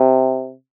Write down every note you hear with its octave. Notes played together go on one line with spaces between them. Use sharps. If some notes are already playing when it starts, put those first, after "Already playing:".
Already playing: C3